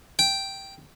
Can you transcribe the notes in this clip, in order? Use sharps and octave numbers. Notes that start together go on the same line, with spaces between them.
G5